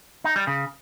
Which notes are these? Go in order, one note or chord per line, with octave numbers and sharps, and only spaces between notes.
D#4
G3
C#3